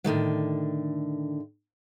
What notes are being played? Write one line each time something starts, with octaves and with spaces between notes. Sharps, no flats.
A2 D3 D#3 F#3